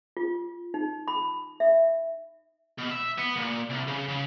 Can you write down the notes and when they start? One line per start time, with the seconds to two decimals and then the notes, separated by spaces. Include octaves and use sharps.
0.17 F4
0.74 D#4
1.08 B5
1.60 E5
2.78 B2
2.91 E5
3.18 B3
3.37 A#2
3.70 C2
3.88 C#3
4.09 C#3